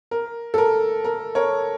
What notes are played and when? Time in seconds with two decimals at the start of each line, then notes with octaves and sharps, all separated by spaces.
0.11 A#4
0.54 A4
0.58 A#4
1.04 A#4
1.35 A#4 C#5